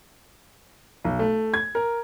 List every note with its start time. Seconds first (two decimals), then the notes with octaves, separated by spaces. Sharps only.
1.04 B1
1.19 A3
1.54 G#6
1.75 A#4